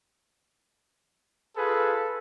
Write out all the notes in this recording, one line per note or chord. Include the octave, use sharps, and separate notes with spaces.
F4 G#4 A4 B4